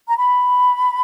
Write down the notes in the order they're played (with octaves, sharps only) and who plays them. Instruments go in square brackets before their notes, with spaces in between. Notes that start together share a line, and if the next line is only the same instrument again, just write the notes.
[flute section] A#5
B5